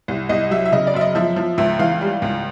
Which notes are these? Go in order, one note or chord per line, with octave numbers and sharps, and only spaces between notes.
C2
C2 D#5
F#3 E5
E5
C#3 D#5
D5
F#2 E5
D#5
F3 E5
F3
C#2 E5
E3 F5
G3
C#2